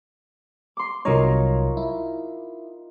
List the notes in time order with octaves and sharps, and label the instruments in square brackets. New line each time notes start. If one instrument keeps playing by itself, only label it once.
[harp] C6 D6
[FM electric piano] C2 F#3 C#5 [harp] D#4 F4 A#4
[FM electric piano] E4